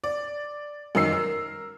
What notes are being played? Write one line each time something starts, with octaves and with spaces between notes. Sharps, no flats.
D5
F#2 D#3 D#5 E6 C7
A#4